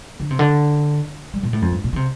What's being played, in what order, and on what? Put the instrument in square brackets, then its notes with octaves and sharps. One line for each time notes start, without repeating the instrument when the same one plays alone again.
[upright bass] D3
C3
D3
G3
A#2
A2
F2
G2
A#2
D3
C3